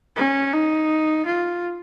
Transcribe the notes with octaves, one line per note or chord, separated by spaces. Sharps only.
C#4
D#4
F4